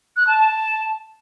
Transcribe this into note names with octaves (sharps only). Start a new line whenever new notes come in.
F#6
A5
A5